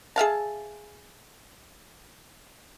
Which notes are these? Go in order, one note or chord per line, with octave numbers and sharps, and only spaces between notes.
G#4 E5 F5 A5